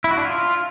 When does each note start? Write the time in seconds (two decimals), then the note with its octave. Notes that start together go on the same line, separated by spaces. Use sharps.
0.04 E4
0.11 F#4
0.17 D4
0.24 F4